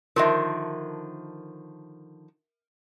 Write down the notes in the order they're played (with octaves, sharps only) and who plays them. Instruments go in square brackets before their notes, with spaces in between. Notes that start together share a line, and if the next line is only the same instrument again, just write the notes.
[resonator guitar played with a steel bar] D3 D#3 F3 [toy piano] A#4 E5